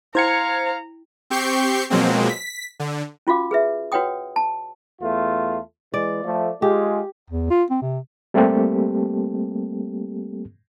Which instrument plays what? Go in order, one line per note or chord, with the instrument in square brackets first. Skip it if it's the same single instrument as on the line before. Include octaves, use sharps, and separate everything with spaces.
[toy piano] E4 G5 [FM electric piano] C5 G#6 C#7 [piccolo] F5 [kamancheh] A#5
[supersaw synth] C4 G4 C#6 G6 C7
B2 F3 F#3 G#3 A#3 C4
B6
D3
[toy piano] C#4 F4 F#4 F5 D6
G#4 B4 E5
F#4 B4 C#5 F#5 G5 D#6
A5
[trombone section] E2 A3 F4
[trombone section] E3 G#3 [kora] D5
[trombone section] F3 A3
[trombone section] G#3 F4 G#4 [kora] G4
[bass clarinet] E2
F4
C4
C3
[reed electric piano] G3 A3 A#3 C4 G4 A4